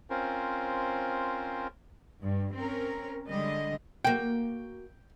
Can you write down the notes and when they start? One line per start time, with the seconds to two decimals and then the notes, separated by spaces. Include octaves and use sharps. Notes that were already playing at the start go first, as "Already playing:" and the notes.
0.10 C4 C#4 F4 A#4 C5
2.22 G2
2.54 C4 C#4 A#4
3.28 D3 G3 G#3 D#5
4.05 A#3 F#4 G5